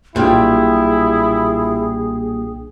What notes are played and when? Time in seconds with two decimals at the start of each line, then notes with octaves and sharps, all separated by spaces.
0.16 B1 A#2 G3 D4 E4 G#4 G5